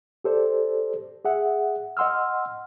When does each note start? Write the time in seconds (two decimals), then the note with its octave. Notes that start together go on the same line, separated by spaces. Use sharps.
0.24 G4 A4 C5 D5
1.25 G#4 E5 F#5
1.97 D#5 F#5 C6 E6 F6